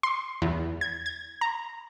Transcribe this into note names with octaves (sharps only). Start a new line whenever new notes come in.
C6
E2
G#6
G#6
A#5